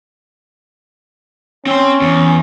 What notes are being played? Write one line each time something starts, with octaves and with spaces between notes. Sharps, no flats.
C4 C#4 C6
E2